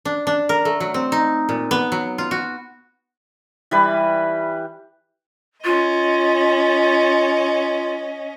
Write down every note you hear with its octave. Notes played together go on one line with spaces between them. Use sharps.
D4
D4
A#4
A3
F#3
C4
D#4
A#2
B3
F#3
F4
F#4
E3 G3 B4
C#4 F4 D#5